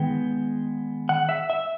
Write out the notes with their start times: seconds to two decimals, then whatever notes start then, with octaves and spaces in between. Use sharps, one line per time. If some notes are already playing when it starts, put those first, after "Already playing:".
Already playing: D#3 G#3 B3 G5
1.09 F#5
1.29 E5
1.50 E5